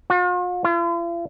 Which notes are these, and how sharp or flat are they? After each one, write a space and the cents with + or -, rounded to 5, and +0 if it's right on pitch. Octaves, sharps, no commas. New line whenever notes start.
F4 +45
F4 -45